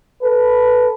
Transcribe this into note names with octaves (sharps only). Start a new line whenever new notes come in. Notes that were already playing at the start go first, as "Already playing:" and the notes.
A4 B4